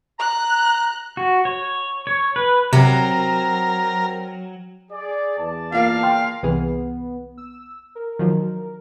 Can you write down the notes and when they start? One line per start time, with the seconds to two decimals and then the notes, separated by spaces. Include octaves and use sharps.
0.19 A#5 F#6
1.17 F#4
1.45 C#5
2.07 C#5
2.36 B4
2.73 C3 F#3 C4 A#4
4.92 G#4 D5
5.39 E2 D5 A5
5.72 A#3 F4 F5
6.03 G5 C6 F6
6.43 C2 E3 B3 G#4
7.38 E6
7.95 A#4
8.19 D#3 F3 F#3